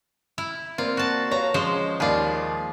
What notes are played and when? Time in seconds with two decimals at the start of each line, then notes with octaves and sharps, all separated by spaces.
0.38 E4
0.78 A#3 C4 F4 D5
0.97 F#4 A5
1.31 B4 C#5 F5 A#5
1.54 F3 G#3 C#4 C5 D#5
2.00 D#2 D#3 F4 G#4 D5 D#5 F5 B5